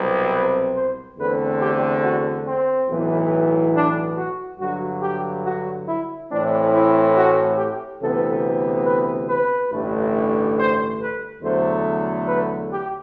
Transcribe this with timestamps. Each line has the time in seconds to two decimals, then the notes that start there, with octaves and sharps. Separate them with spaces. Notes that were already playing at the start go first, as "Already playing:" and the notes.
Already playing: C2 B2 F#3 C4
0.33 B4
0.76 C5
1.18 E2 D3 A3 C4 B4
1.60 G4
2.03 F#4
2.47 C4
2.89 B1 A2 E3 B3
3.74 D4
4.17 F#4
4.60 G2 D3 F#3 F#4
5.02 G4
5.45 F#4
5.88 E4
6.30 A2 E3 A3 C4 D4
6.73 E4
7.16 F#4
7.58 G4
8.01 D2 C3 E3 B3 A4
8.86 B4
9.29 B4
9.72 A1 G2 D3 A3
10.58 C5
11.00 B4
11.43 E2 D3 F#3 A3 C5
12.28 B4
12.71 G4